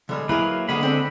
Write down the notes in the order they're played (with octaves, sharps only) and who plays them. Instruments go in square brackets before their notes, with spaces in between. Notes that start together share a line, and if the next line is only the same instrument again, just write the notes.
[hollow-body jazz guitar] D3 G3 G#3
[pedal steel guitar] F#3 A#3 B4 [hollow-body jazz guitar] E4 G#4 A#4
[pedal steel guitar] D3 B5 [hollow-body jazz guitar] G#3 A#3 B3
[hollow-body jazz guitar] G#3 C4 D4